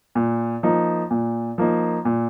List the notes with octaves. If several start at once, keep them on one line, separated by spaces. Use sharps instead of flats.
A#2
F3 A#3 D#4
A#2
F3 A#3 D#4
A#2